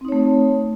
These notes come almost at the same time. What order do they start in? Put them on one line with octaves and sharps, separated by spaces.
C4 D#4 C#5 A3